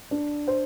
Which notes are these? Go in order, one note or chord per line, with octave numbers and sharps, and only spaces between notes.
D4
C5